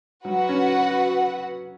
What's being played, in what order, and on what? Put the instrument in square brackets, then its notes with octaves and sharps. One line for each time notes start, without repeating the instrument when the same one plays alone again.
[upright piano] F#3 [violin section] F#4 B4 F#5
[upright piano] C#4